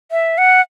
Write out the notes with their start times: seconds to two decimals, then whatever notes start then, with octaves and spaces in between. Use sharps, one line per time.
0.11 E5
0.38 F#5